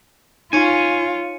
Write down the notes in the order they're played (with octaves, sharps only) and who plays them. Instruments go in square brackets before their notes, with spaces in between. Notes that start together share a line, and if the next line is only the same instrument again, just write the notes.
[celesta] D#4 [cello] F4 [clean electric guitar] C#5 G#5